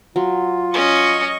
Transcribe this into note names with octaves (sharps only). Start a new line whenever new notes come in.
F#3 F4
C#4 D#5 C#6